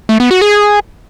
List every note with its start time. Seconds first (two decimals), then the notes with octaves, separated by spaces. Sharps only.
0.09 A3
0.20 B3
0.31 F#4
0.41 G#4